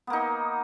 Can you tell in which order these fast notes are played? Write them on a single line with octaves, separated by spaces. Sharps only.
B3 A#3 D#4